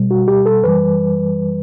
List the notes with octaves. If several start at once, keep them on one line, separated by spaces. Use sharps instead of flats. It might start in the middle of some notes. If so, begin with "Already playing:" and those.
Already playing: B2 G3
F#4
G4
A4
F#2 E3 G3 B4